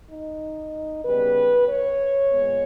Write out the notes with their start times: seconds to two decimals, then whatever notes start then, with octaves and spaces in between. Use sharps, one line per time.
0.10 D#4
1.04 C#3 G3 B3 B4
1.69 C#5
2.32 A#2 G#3 B3